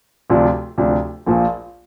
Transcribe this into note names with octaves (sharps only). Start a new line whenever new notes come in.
D2 C3 F3 D4
D2 C3 F3 D4
A#1 A#2 F3